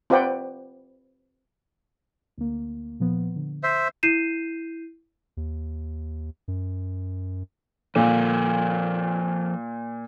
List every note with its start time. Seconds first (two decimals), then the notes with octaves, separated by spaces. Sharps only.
0.10 C4 F4 B4 D5 F#5 G5
2.37 D2 A#3
3.00 A#2 F3 B3
3.36 D3
3.63 C5 E5 G6 C7
4.03 E4 G6 C7 D#7 E7
5.37 D#2
6.48 F#2
7.96 A#2 F3 A4 A#4